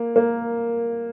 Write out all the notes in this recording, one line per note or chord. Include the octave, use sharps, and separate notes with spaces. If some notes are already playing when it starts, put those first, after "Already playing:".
Already playing: A#3
A#3